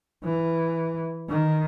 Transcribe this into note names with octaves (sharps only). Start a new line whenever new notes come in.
E3
D#3